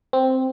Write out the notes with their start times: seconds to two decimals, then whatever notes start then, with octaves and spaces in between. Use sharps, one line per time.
0.13 C4